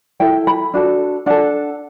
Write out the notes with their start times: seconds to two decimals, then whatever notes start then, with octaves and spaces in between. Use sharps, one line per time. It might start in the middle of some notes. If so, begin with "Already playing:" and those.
0.20 E4 A4 G5
0.47 B5
0.74 D4 F#4 A4
1.26 D4 A4 F#5